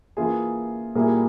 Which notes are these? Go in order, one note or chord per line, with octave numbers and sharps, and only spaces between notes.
E3 A#3 F4 G#4
A#2 G3 A#3 E4 G#4